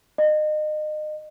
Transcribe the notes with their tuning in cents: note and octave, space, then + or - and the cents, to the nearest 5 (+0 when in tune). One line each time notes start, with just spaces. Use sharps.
D#5 -30